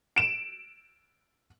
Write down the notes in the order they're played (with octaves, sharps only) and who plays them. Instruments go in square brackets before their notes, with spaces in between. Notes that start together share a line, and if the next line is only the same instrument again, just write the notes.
[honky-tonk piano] D7 E7